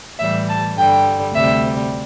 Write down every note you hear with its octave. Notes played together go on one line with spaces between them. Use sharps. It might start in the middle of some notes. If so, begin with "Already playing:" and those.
A2 E3 G3 E5
A5
G2 D3 G3 G5
D2 C3 G3 E5